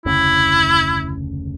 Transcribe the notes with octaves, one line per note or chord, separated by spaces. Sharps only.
F1 D2 C#3 E4